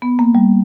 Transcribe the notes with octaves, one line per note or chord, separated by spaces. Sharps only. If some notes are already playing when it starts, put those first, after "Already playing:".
B3
A#3
G3